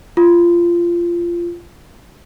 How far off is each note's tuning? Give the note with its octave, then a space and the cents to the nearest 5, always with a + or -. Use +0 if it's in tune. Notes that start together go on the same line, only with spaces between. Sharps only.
F4 -20